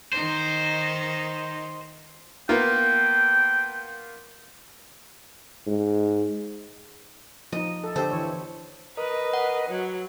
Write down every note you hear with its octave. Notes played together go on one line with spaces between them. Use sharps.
D#3 D#4 C5
A#3 B3 F4 G5
G#2
F3 D#4 D#5
A4
D3 G4 A4 C5
E3 C#5
A#4 B4 D#5
F#5
F#3